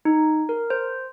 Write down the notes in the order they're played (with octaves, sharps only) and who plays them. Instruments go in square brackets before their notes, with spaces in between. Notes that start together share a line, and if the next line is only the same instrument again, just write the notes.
[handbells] D#4
A#4
C5